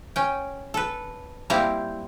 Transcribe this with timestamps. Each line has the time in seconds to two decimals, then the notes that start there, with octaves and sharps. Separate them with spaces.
0.16 C#4 G5
0.74 A4 B4
1.50 G3 A#3 C4 E4 G4 F5